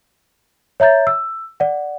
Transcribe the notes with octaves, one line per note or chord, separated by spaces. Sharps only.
C#5 E5 A#5 G6 A6
E6
D5 F#5